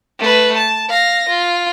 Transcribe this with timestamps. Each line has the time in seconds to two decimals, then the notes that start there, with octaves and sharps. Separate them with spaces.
0.20 A3 B4
0.57 A5
0.90 F5 A#6
1.29 F4